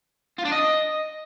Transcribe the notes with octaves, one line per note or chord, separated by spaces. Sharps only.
F4
D4
D#5